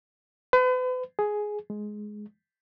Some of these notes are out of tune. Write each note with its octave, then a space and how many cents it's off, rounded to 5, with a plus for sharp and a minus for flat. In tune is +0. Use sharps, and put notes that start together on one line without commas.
B4 +40
G#4 +10
G#3 +10